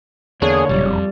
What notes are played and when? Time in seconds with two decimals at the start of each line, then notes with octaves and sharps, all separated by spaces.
0.42 E2 D3 A#3 D4 G#4 C#5
0.69 E1 A#2 C#3 F#3 G3
0.87 F2